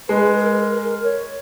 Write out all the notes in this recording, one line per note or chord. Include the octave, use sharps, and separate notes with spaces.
G#3 B4
B4
A#4
A#4
C#5